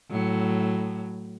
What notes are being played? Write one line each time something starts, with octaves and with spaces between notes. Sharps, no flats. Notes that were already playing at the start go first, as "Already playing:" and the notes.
A2 F#3